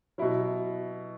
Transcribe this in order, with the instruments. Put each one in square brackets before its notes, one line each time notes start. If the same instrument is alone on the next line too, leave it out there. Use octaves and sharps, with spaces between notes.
[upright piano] B2 F#3 E4